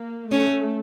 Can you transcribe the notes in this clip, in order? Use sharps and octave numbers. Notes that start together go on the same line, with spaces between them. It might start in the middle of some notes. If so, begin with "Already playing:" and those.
Already playing: A#3
A3 C#4